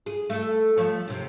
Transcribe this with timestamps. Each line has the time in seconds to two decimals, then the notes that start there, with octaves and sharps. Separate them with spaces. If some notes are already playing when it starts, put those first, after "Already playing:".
0.06 G#4
0.30 A3 A4
0.77 F3 A3 C#5
1.08 D#2 C3